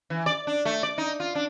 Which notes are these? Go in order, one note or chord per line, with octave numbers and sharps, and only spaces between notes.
E3
D5
D4
A3
D5
D#4
F4
D4